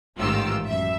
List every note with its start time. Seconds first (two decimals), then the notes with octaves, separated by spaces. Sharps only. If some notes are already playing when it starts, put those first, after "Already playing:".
0.19 A1 G#2 D#3 F4 G4 E6
0.66 F#2 E5